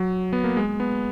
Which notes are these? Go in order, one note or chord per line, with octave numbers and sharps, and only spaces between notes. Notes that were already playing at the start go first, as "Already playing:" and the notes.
Already playing: F#3
B3
A#3
G#3
B3